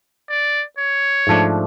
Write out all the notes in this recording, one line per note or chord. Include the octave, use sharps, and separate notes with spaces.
D5
C#5
G#2 F3 A3 D4